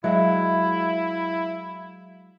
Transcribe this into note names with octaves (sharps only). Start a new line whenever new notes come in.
F#3 G#3 E4 E5 F5